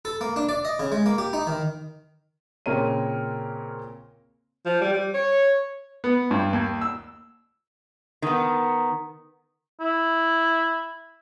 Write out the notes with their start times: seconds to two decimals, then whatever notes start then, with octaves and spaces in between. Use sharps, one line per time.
0.05 A4
0.21 A#3
0.36 D4
0.49 D5
0.65 D#5
0.79 C#3
0.92 G#3
1.06 A#3
1.18 G4
1.33 D#4
1.47 D#3
2.66 A#2 C#3 C4 A#4 C#5 D#7
4.66 F3
4.81 G3
4.93 G3
5.14 C#5
6.04 B3
6.31 G2
6.53 D#2
6.81 E6
8.22 D#3 B3
9.81 E4